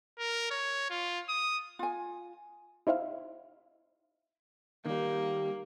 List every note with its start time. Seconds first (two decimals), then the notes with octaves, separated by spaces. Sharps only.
0.19 A#4
0.51 C#5
0.90 F4
1.29 D#6
1.79 F4 G#5
2.87 D#4 E4 C5 E5 F5
4.86 D#3 G3 A#3